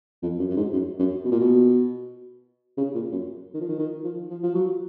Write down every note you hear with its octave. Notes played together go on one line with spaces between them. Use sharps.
F2
F#2
F#2
G#2
F#2
F#2
B2
A#2
B2
C#3
A#2
F#2
D#3
F3
D#3
D#3
F3
F3
F3
F#3